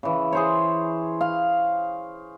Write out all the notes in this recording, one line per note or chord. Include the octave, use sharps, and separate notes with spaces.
C#3 E3
G#4 C5 C#5
F5